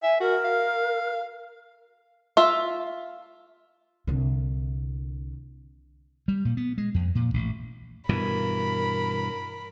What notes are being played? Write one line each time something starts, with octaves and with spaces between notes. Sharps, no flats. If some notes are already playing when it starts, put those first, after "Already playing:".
E5 G#5
F#4 A#4
F5
F4 E5
C2 D3
G3
A#2
B3
G#3
F2
A#2
A1
G2 B2 E3 A#4 B5